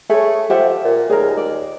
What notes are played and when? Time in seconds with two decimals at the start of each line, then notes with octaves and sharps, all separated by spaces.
0.10 A3 G#4 C#5
0.50 F3 G4 E5 F#5
0.84 A#2
1.10 D#2 G#4 A#4
1.37 D5